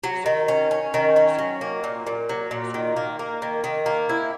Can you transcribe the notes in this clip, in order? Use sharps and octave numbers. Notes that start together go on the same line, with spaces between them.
F#3
D#3
C#4
C#4
D#3
C#4
F#3
A#3
A#2
A#2
F#3
A#2
D#3
A#3
A#3
D#3
D#3
A#3
E4